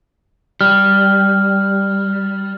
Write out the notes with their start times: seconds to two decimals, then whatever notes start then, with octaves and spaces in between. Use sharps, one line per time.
0.61 G3 F6